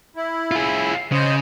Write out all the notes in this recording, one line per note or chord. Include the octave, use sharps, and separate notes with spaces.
E4
F4 G#4
C#3 C5 D#5